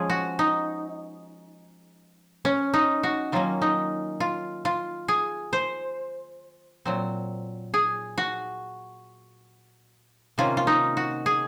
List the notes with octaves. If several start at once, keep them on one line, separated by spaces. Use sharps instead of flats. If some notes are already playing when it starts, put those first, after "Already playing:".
Already playing: F3 G#3 C#4 G#4
F#4
D#4
C#4
D#4
F#4
D#3 F#3 A#3 C#4 F4
D#4
F4
F4
G#4
C5
A#2 F#3 C4
G#4
F#4
C3 D#3 A#3 C#4 F4
F4
D#4
F#4
G#4